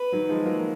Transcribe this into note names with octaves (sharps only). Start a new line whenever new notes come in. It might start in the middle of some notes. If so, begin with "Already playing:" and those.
Already playing: B4
D#3 F#3
F3 G#3
F#3 A#3